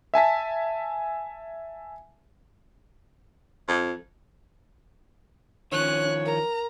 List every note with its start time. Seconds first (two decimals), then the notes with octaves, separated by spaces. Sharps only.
0.14 E5 G#5 A5 B6
3.68 F2
5.72 D#3 F3 C#4 D4 C#5 F#6
6.25 A#4 A#5